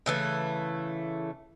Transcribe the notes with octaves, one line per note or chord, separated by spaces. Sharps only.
C#3 E3 A3